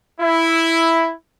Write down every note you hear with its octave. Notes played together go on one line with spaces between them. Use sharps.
E4